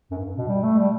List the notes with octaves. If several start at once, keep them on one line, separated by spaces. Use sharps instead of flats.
F#2
G2
B2
G3
A3
G3